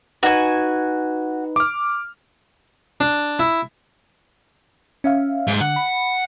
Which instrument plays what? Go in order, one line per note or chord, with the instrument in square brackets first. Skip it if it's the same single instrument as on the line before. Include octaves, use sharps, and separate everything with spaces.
[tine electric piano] D#4 B4 [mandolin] F#4 G#5
[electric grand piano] D6 F6
[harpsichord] D4
E4
[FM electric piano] C#4 E5 F5
[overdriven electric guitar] G#2
[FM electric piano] D3 [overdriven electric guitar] F#5
[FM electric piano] B5